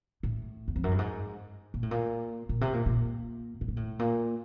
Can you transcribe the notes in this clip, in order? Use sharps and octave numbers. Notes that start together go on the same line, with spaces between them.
A2
E2
F2
F#2
G2
G#2
A#2
A2
A#2
A#2
C3
A#2
A#2
A2
A#2
A2
A#2